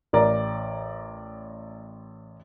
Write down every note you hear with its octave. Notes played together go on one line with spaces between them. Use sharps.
A1 A#4 D5 A#5